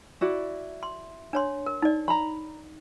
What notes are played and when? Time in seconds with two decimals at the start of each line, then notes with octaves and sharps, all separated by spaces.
0.21 E4 F#4 D5
0.83 C6
1.33 D4 C#5 C6
1.66 A#4
1.82 D#4 D5
2.08 A#5 B5